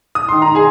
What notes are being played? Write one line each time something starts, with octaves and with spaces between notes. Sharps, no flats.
D#6
D#3 C6
A#5
D#3
G#4 G#5